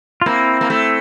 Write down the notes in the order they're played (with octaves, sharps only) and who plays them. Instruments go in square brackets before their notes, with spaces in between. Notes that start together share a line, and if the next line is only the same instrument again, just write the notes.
[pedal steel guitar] F4
[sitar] A#3 [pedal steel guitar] C4 E4
[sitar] A#3
A3